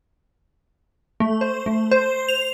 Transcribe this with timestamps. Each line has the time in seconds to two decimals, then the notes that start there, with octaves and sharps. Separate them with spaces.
1.20 A3
1.41 C5
1.66 A3
1.91 C5
2.28 F7